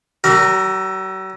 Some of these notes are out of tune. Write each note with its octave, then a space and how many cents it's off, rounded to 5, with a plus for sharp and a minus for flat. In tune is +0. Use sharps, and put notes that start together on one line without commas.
F#3 +45 A#4 -15